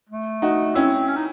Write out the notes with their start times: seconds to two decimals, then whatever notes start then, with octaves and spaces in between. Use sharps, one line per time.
0.09 A3
0.42 D#4 F#4
0.75 C4 C#4 E4
1.08 C#4
1.16 D#4